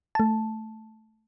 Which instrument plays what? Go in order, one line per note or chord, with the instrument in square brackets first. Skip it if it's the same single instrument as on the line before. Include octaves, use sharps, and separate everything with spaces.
[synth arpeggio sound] A3 A5